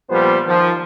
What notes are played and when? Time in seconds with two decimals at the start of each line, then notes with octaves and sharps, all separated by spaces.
0.10 A#2 F3 G3 B3 C5
0.47 D#3 F3